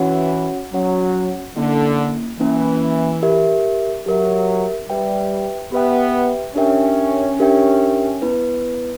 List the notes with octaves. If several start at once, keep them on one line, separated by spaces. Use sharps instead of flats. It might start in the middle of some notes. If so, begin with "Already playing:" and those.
Already playing: E3 C#4 F#4 C#5 F#5
F#3 C#4 F#4 C#5 F#5
D3 A#3 C#4 E4
E3 A#3 C#4 E4
G4 A#4 E5
F#3 G4 A#4 E5
G3 G4 B4 E5 G5
B3 G4 B4 E5 G5
C#4 D4 G4 A#4 E5 G5
D4 G4 A#4 E5 G5
B3 E4 B4